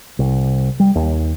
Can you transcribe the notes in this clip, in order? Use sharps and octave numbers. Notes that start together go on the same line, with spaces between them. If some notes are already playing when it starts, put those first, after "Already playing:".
C2
G3
D#2